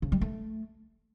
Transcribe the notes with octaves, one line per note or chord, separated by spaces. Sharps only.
C#3
G3
A3